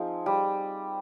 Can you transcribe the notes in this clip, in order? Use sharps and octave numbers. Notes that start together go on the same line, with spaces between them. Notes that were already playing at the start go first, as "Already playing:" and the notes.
Already playing: F3 C4 D#4 G#4
G3